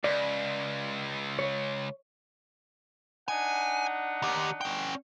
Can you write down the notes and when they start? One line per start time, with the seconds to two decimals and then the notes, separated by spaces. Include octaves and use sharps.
0.04 C#2 D5
1.39 C#5
3.28 D4 D#4 F#5 G#5
4.22 D#3 G4
4.61 C#4 G5